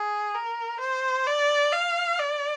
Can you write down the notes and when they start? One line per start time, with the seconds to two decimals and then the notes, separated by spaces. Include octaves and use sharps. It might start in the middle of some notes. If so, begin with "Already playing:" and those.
Already playing: G#4
0.34 A#4
0.80 C5
1.27 D5
1.73 F5
2.19 D5